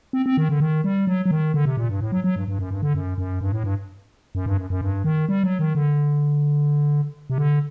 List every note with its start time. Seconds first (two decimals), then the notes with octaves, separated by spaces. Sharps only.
0.13 C4
0.26 C4
0.37 D#3
0.49 D3
0.60 D#3
0.84 G3
1.07 F#3
1.26 F#3
1.31 D#3
1.54 D3
1.65 C3
1.77 A#2
1.89 G2
2.01 A2
2.12 F#3
2.24 F#3
2.36 G2
2.48 G2
2.59 F#2
2.71 G2
2.82 D3
2.94 F#2
3.18 F#2
3.41 G2
3.52 A2
3.64 G2
4.35 F#2
4.46 G2
4.57 F#2
4.70 F#2
4.81 G2
5.04 D#3
5.29 G3
5.44 F#3
5.59 D#3
5.75 D3
7.30 C3
7.38 D3